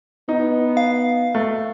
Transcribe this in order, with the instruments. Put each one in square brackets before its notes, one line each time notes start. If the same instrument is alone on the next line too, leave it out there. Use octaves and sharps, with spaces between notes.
[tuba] B3 [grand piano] D#4
[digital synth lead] F5
[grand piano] A3